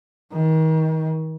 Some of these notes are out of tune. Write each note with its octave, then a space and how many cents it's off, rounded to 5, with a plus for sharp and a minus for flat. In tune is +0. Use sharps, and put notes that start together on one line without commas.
D#3 +35